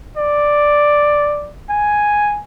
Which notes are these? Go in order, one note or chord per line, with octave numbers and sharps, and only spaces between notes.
D5
G#5